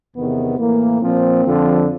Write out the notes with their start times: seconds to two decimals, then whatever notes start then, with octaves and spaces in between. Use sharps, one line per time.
0.15 E2 C3 D#3 B3
0.58 A2 E3 A#3
1.01 A#2 F3 C4
1.44 F2 D3 F3